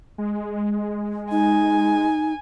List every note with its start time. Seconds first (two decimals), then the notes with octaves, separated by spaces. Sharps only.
0.18 G#3
1.31 D#4 G#5